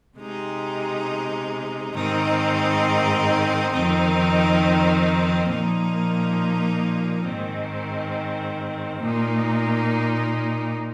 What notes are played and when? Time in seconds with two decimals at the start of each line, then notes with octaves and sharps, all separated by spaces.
0.19 C3 G#3 D#4
1.95 G#2 D#3 C4 D#4
3.72 F2 D#3 C4 D#4
5.49 A#2 F3 A#3 D#4
7.25 G#2 D#3 C4
9.02 A#2 A#3 D#4